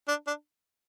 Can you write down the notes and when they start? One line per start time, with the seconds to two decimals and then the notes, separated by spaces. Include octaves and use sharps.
0.08 D4
0.27 D4